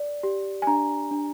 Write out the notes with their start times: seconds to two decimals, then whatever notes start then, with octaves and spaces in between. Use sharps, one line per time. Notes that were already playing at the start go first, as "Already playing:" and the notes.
Already playing: D5
0.23 G4
0.62 G#5
0.67 D4 A#5
1.11 D4